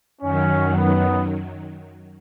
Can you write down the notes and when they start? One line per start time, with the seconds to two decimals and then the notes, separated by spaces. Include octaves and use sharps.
0.21 F#2 D#3 F#3 C#4
0.74 B3